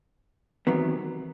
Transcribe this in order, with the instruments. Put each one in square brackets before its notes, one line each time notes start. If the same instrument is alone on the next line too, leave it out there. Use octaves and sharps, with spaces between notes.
[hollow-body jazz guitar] E2 C3 D#3 F#3 B3